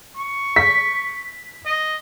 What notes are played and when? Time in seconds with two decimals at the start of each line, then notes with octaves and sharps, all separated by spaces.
0.16 C#6
0.56 B6
1.66 D#5